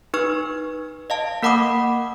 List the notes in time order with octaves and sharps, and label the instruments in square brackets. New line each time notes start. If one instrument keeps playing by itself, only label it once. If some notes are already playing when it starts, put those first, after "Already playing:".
[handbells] D#4 B4 C#6 F6
D#5 F5 A5
A#3 A#4 F#5 B5 D6 D#6